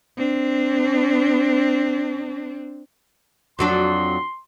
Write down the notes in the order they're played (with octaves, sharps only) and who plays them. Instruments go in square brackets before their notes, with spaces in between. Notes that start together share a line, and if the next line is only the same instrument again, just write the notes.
[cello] C4 D4
[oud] F2 F#3 D4 [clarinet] C6